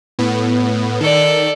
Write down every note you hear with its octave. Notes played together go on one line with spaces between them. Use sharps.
A2 B3
D#3 A4 D5